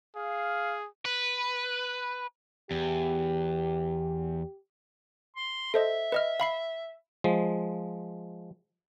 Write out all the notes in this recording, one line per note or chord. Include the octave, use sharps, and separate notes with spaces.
G#4 F5
B4
E2 G4
C6
A4 C5 D#5 E5
B4 D#5 F6
F5 B5 C7
F3 G#3